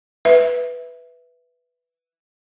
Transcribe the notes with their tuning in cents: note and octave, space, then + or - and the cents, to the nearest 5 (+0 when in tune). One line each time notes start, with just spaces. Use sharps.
B4 +0 E5 +0